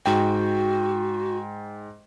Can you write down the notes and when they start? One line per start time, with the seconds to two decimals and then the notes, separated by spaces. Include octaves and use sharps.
0.06 G#2 F#4 G5